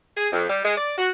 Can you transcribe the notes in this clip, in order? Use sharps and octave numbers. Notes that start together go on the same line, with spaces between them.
G#4
F2
G3
G#3
D5
F#4